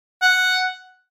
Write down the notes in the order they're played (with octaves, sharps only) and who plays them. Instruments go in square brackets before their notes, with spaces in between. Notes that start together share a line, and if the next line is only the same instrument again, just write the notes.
[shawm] F#5